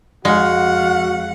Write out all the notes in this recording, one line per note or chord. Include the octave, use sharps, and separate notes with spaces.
F2 G#3 F#4 F5 F#5